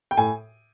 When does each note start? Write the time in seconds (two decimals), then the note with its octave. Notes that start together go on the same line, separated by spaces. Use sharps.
0.11 G5
0.17 A2 G#5